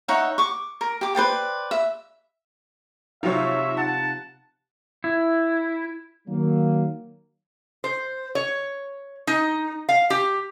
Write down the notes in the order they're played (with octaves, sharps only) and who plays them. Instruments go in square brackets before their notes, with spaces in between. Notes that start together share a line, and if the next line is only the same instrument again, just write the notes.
[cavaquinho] D#4 C#5 E5 F#5
C#6 D6
A#4
G4 D6
B4 C5 D5 G5
E5
[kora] C3 F3 [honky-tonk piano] F#3 F4 C#5 [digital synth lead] D#4 [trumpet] E5
[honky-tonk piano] F#5 [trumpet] A5
[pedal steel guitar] E4
[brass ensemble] D#3 F#3 A#3
[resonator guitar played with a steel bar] C5
C#5
D#4
F5
G4